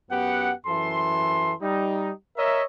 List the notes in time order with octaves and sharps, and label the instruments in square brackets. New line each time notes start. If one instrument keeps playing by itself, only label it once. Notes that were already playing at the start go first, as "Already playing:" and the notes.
[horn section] F#2 B3 G4 F#5
F#2 E3 A4 C6
G3 D#4
A#4 C#5 D#5 E5